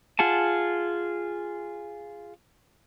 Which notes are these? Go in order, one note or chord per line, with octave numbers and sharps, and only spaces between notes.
F4 G#4 F#5 A5